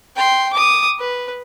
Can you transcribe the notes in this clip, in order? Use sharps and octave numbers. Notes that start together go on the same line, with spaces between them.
G5 C6
D6 D#6
B4